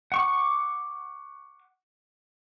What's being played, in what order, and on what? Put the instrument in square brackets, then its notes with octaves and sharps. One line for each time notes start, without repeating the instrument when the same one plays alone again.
[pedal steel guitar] F#5 C#6 D6